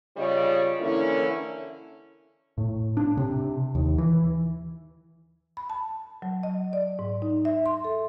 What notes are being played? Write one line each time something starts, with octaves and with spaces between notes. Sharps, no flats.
C#3 G3 F4 C#5 D#5
D3 E3 A#3 C#4 E4
A2
D4
C3
D#2
E3
B5
A5
F#3
D#5
D5
G#2
D#4
E5
C6
A4